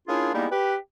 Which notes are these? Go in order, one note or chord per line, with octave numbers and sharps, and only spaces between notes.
A#3 C#4 D4 E4 F4 G#4
G3 G#3 A#3 B3 D#4 E4
G4 B4